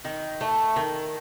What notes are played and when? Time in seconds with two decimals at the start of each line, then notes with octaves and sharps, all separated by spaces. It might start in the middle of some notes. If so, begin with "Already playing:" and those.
0.05 D#3
0.41 A3
0.76 D#3